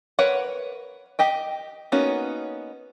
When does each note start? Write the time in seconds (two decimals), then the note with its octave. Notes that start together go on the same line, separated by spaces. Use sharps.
0.19 A#4 B4 C#5 F#5
1.19 G4 D#5 G5
1.92 A#3 B3 C#4 D#4 F#4